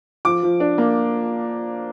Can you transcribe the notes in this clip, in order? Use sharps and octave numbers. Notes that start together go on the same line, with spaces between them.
F3 D6
F3
D4
A#3